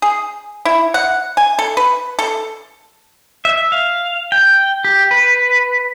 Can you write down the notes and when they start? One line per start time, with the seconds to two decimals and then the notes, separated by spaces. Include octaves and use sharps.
0.02 G#4
0.65 E4
0.94 F#5
1.37 G#5
1.59 A4
1.77 B4
2.19 A4
3.45 E5
3.72 F5
4.32 G5
4.85 G4
5.11 B4